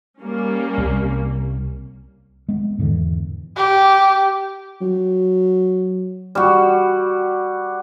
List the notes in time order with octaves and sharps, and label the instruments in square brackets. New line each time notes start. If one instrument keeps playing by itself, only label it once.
[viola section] G3 A#3 C#4
[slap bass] C2
[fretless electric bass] G#3 B3
E2 G#2 D3 E3
[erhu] G4
[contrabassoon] F#3
[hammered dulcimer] G3 F#4